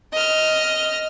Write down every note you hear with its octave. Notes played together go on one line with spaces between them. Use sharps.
D#5 F6